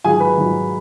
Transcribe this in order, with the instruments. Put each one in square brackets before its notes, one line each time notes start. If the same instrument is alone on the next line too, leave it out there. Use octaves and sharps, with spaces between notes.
[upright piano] G#2 D#3 F#3 G#4 G#5
B4 B5
G#2 D#3 F#3